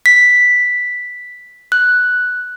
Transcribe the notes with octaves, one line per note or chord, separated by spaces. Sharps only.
B6
F#6